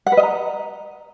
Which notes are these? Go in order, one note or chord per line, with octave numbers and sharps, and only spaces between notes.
F#5
B4
D#5
A#5